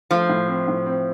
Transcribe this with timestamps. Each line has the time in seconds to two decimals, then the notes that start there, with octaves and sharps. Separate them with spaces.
0.11 F3 A3
0.29 A2
0.48 C4
0.68 A2
0.86 C4